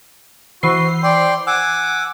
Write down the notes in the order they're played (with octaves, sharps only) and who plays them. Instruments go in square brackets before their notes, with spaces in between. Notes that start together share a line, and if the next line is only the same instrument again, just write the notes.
[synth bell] E3 C5 C7 [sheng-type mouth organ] F#4
[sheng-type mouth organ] D5 G5 C6
[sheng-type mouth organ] F#5 G#5 D6 [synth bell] E6